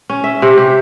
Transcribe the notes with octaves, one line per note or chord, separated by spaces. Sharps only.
C#4
E5
C3
G4